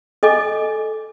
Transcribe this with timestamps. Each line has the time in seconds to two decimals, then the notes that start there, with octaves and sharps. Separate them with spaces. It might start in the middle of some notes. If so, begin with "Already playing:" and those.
0.23 A4 D#5 G#5 D6